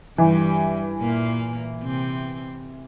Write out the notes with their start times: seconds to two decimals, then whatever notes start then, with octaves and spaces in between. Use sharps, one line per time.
0.18 G2 E3 G3
1.00 A#2 A#3
1.82 C3 C4